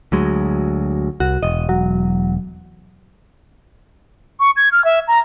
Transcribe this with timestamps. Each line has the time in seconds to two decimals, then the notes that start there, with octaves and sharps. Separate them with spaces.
0.12 D2 F#3 G#3
1.20 C2 F#4
1.43 E1 D#5
1.69 F#3
4.40 C#6
4.56 G#6
4.72 F6
4.85 E5
5.08 A#5